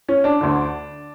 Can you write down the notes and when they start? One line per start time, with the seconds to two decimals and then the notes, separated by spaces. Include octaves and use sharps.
0.09 C#4
0.24 D4
0.41 D2 D3